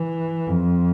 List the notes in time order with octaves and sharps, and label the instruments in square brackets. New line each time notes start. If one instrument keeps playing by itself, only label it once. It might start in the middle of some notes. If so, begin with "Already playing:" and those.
Already playing: [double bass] E3
F2